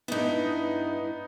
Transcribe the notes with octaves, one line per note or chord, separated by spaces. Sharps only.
G2 B3 D#4 E4